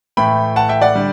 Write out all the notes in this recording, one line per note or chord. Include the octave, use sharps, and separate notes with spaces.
A2 E3 A3 G5 B5
F#5 A5
E5 G5
D5 F#5
D3 G3